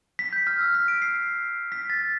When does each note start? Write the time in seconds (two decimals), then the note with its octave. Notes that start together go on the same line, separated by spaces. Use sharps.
0.19 B6
0.33 G6
0.47 F6
0.61 E6
0.75 B6
0.88 D7
1.02 C7
1.72 B6
1.90 A6